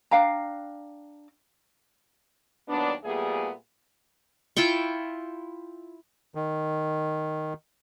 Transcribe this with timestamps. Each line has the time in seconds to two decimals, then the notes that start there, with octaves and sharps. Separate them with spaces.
0.11 D4 F5 G5 A#5
2.69 D#2 F#3 B3 D4
3.04 A#2 G3 A3 B3 G#4
4.56 E4 F4 G5 C#6
6.35 D#3